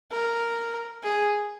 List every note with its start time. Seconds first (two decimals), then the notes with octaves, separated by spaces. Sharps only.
0.12 A#4
1.04 G#4